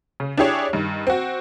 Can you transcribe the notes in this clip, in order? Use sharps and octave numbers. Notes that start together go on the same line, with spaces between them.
C#3
D4 E4 G4 G#4 C#5
G2 D#3
C4 F#4